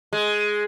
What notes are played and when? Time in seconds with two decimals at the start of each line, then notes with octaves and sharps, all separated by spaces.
0.13 G#3